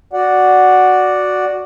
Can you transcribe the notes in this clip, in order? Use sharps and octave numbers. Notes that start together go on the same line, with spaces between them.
F#4 D5 F#5